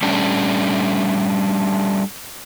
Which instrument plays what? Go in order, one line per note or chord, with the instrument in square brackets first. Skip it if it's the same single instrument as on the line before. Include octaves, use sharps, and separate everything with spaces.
[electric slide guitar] G3 A3 C#4 D4